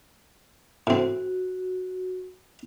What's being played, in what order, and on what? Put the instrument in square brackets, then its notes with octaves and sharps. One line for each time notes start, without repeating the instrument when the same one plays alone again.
[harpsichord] A2 C4 [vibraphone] F#4